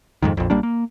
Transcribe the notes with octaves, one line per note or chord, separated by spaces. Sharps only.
F2 G#2 D#3
A#1 F2
A#1 G3 A#3 D4
A#3